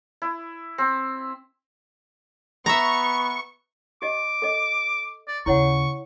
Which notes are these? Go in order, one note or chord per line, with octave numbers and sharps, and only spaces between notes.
E4
C4
B3 E5 A#5 C#6
G4 D#5 D6
A4 D#5
D5
D#2 C#3 E4 C#5 F#5 C#6